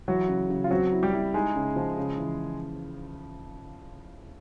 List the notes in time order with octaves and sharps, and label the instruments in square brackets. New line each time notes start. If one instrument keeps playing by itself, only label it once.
[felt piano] E3 [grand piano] F#3 F#4
[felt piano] C#3
C#3
[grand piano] F4
[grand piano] F#3 F#4 [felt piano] C4
[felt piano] E4
[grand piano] G3 G4
[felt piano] E4
[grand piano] G#3 G#4 [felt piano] D#4
[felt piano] C#3
F3
C#3
E3